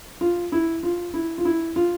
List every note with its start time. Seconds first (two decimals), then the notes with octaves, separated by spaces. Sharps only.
0.21 F4
0.52 E4
0.83 F4
1.14 E4
1.38 F4
1.45 E4
1.76 F4